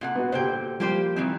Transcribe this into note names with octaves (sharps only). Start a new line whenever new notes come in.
A#2 F4 F#5
B3 F#4
A#2 D3 G4 C5 G5
F3 G3 A#3 G4 C5
D#3 E3 C4